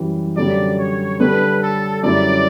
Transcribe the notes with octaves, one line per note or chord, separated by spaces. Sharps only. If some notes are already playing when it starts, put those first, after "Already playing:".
Already playing: F#2 E3 G3
F#2 D3 G3 D5
C#5
D3 G3 D4 A4 B4
A4
F#2 D3 G3 C#4 E4 D5